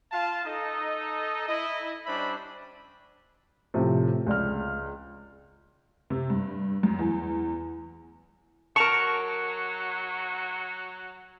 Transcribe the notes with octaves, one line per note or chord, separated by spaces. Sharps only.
F4 F5 A5
D#4 A4 D#5
E4 D#5
G3 C#4 D4 C5 E5 B5
A2 C3 F3
C#2 D5 F6
C3
G2
F#2
E2
F#3 A#4 A5 C#6